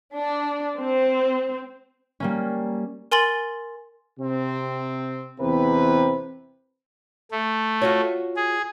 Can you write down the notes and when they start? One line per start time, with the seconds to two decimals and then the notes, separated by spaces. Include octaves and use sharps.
0.13 D4
0.78 C4
2.20 G3 A#3 C#4
3.12 A#4 G#5 C6 A6 F#7
4.19 C3 C4
5.40 E2 C3 C4 B4
7.32 A3
7.82 F4 F#4 C#5
8.36 G#4